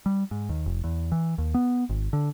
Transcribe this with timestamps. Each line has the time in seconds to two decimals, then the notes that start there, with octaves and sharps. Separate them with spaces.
0.06 G3
0.31 G#2
0.49 D#2
0.66 F1
0.84 E2
1.12 E3
1.38 D#2
1.54 B3
1.89 G#1
2.13 D3